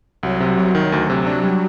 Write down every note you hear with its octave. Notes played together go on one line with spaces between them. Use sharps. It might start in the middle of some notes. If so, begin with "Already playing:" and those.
C2 F#3
C3
C2 F#3
D#3
D2
C3
F#3 D4
G3